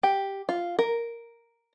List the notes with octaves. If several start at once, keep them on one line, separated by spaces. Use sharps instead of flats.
G4
F4
A#4